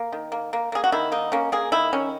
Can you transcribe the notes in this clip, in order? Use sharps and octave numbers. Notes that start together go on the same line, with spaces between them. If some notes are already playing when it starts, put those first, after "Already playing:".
Already playing: A#3
D#3
A#3
A#3
A#3 G#4
F#4
D#3 E4
A#3 D#4
A#3 C#4
A#3 G#4
D#3 E4
D#3 C#4